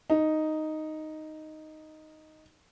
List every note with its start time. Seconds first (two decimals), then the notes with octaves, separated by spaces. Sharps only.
0.10 D#4